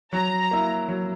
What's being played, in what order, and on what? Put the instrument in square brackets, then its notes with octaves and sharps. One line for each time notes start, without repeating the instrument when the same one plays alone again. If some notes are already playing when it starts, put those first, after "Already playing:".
[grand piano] F#3 [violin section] A#5
[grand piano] A#3 E4
F#3